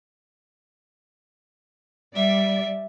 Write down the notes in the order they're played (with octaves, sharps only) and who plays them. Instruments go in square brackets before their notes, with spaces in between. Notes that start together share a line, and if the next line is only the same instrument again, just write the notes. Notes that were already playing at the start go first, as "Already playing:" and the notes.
[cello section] G3 D5 [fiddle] E5